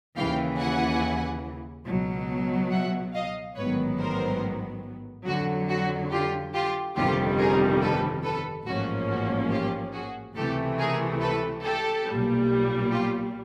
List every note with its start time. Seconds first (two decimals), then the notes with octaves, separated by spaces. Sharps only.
0.16 D#2 C#3 E3 F5 G5
0.58 F#5 G#5
1.86 C#2 B2 F#3
2.71 E5 F#5
3.14 D#5 F5
3.56 A1 G#2 D#3 F#3 B3 B4 C#5
3.99 A#4 C5
5.26 F2 D3 F#3 F#4
5.70 F#4
6.11 F4 G4
6.54 F4 G4
6.97 G1 F2 C3 D#3 G3 F4 G4
7.39 G#4 A#4
7.81 A4 B4
8.24 A4 B4
8.66 A1 G#2 F3 A#3 C#4 F#4
9.09 F#4
9.51 F4 G4
9.93 F#4 G#4
10.36 C#2 C3 E3 A3 G4 A4
10.79 G#4 A#4
11.21 A4 B4
11.64 G4 A4
12.06 B1 A#2 G3
12.91 F4 G4